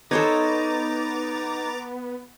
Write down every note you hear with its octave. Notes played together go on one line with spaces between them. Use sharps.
B3 D#4 A4 C5 C#5 A#5 D6 A6